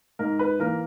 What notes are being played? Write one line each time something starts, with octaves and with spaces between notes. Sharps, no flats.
G#2 A#4
B4
E3 A#3 A#4